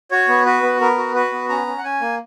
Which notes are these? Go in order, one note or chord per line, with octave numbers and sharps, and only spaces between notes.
F#4 C#5
B3
F#4 B4
B3
B3 A#4
F#4
F#4 B4
B3
C#4 A#5
C#4
F#5
C#4 G#5
A#3